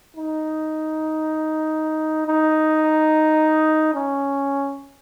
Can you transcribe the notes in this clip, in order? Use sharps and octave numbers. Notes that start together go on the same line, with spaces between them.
D#4
D#4
C#4